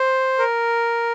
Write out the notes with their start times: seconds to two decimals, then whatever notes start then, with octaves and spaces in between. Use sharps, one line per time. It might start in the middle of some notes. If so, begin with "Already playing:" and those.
Already playing: C5
0.39 A#4